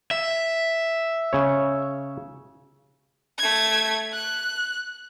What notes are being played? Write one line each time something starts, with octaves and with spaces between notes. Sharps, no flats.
E5
C#3 C#5
A3 G#6
F#6